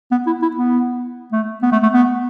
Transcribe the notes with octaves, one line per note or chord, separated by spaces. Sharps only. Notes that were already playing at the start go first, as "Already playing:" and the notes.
B3
E4
E4
B3
A3
B3
A3
A3
B3